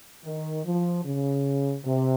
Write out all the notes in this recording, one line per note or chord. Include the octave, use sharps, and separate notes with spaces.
D#3
F3
C#3
C3